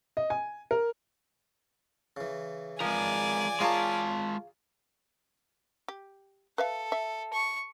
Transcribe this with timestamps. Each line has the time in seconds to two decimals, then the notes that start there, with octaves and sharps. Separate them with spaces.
0.17 D#5
0.30 G#5
0.71 A#4
2.17 C#3 E3
2.80 F3 G#3 A#4 D5 G#5
3.60 G#3 F4 G#4 A#4 C#5 F5 A5 A#5
5.88 G4
6.58 A4 B4 E5 F5
6.92 E5
7.33 C#6